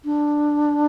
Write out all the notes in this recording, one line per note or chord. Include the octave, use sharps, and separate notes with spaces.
D4